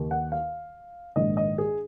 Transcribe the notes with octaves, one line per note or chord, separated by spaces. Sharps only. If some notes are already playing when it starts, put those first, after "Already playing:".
Already playing: D#2 D#3
F#5
F5
A#1 G#2 D#3 D#5
D#5
G#4